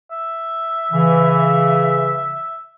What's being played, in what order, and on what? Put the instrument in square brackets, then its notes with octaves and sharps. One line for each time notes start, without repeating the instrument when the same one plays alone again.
[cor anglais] E5
[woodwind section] C#3 E3